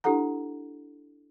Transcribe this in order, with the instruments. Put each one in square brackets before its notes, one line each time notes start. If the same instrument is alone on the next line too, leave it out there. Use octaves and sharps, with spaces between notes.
[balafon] D4 E4 G4 A4 F#5 A#5